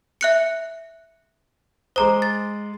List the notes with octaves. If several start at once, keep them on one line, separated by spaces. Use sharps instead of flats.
E5 F#6 C#7
G#3 C5 A#5 D6 D#6
A6